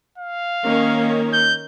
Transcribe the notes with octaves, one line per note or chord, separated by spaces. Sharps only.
F5
D#3 A#3 C#4
G6